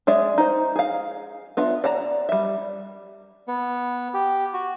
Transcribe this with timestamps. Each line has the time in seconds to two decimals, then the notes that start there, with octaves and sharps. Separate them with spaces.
0.07 G#3 G#4 D5 E5
0.38 D#4 C5
0.76 G#4 F5
1.57 B3 D4 F4 E5
1.84 D5 F#5 A5 A#5
2.29 G3 E5
3.48 B3
4.14 G4
4.53 F#4